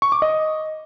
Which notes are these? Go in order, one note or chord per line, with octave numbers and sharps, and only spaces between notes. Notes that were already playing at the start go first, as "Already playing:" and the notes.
C#6
D6
D#5